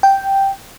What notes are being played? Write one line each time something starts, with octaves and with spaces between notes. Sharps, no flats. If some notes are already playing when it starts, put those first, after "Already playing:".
G5